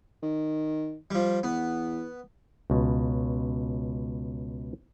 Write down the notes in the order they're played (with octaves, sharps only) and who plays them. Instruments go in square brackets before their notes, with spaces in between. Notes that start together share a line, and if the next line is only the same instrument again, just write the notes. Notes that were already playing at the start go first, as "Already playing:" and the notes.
[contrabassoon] D#3
[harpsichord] F3 G3
[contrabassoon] E2 [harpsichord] B3
[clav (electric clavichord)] C#2 B2